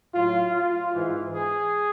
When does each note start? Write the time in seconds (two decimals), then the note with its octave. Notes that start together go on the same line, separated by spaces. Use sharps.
0.14 A2 F#3 F4
0.55 F4
0.95 G#2 E3
1.34 G#4